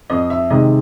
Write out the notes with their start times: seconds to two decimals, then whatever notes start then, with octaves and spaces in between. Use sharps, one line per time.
0.10 F2 D#5
0.30 E5
0.50 C3 D#3 G#3 D#5